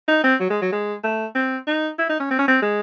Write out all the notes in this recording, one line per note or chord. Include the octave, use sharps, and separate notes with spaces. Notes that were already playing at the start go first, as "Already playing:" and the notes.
D#4
C4
F#3
G#3
F#3
G#3
A3
C4
D#4
E4
D#4
C#4
C4
C#4
C4
G#3